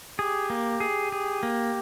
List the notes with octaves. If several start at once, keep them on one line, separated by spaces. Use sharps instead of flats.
G4 G#4
A#3
G#4
G#4
A#3